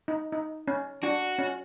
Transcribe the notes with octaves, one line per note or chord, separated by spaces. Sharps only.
D#4
D#4
C#4
D4 F#4
C#4